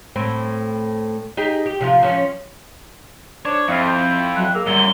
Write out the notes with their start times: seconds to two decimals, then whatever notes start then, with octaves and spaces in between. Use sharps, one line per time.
0.16 A2 C4
1.37 D#4 G4 G#4
1.66 G4
1.81 C3 F3 F4
2.03 F3 C#4
3.45 D4 C5 C#5
3.68 F2 E4 F5
3.87 G6
4.36 F#3 F#6
4.54 A#3 G#4 E6
4.66 F#2 A#2 G3 G7